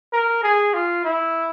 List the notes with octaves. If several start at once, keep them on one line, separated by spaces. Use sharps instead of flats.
A#4
G#4
F4
E4